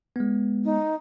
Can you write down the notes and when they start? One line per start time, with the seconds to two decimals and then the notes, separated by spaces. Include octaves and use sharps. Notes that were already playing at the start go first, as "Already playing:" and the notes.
0.16 G#3 B3
0.65 D#4